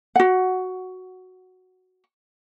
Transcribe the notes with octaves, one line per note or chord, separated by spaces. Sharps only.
F#4 F#5